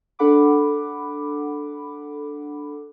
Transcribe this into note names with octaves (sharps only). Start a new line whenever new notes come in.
D4 A4 F#5 B5 D6